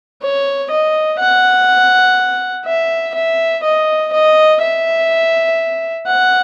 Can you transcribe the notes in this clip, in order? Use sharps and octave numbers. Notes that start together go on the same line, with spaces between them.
C#5
D#5
F#5
E5
E5
D#5
D#5
E5
F#5